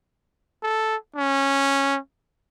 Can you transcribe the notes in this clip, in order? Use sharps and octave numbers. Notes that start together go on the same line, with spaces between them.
A4
C#4